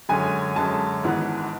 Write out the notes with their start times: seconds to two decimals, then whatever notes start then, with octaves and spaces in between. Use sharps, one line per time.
0.09 F#2 D3 G#3 C#4 G#5
0.56 F#2 D3 G#3 C#4 A5
1.03 G#1 G#2 E3 B3